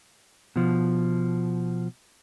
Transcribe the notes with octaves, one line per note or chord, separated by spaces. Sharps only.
B2 F3